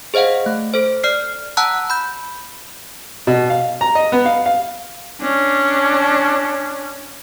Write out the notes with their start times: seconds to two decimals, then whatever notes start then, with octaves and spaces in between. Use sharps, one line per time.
0.14 G#4 C5 D#5 F5 F#5
0.46 A3
0.74 A4 C5
1.04 D5 F6 C7
1.57 F#5 A5 A#5 E6 F#6
1.90 B5 G6
3.27 B2
3.50 F5
3.81 A#5
3.95 D#5
4.12 B3
4.26 F5
4.46 F5
5.21 C#4 D4